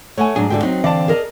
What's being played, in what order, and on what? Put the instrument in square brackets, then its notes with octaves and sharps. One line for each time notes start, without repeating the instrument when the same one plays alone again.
[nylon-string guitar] A3 [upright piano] C#5 F#5 G#5
[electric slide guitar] G#2 G#4 [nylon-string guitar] F#3 D4
[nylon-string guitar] D3 F#4 D5 [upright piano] G5
[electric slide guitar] F#3 [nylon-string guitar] C4 [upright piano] D#4
[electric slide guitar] D3 E3 F5 [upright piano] D5 A5
[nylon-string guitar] G#4 A#4 D#5